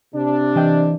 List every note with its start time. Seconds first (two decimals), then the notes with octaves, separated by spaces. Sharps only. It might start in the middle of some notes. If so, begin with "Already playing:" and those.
0.15 C3 D4
0.56 E3 D#5 G5